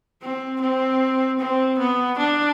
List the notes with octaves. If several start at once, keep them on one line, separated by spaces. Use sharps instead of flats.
C4
C4
C4
B3
D4